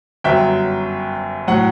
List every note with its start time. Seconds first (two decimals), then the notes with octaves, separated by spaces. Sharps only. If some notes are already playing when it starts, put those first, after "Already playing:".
0.24 G1 F#2 F#3 E5 G5
1.47 A2 F#3 F#5